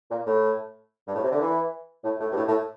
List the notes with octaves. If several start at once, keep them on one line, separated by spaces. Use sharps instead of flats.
A#2
A2
G2
A2
C3
D3
E3
A2
A2
G2
A2
A2